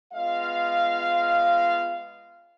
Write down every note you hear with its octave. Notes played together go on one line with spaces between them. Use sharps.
G#3 B3 F4 D#5 F5